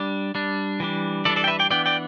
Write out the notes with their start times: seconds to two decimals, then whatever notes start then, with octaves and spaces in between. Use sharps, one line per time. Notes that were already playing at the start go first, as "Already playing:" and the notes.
Already playing: G3 D4
0.35 G3 D4
0.80 E3 G3 D4
1.25 E3 G3 D4 A4 D5
1.36 A4 D5
1.44 G5
1.47 B4 E5
1.59 D5 G5
1.70 E3 B3 D4 D5 G5
1.86 D5 G5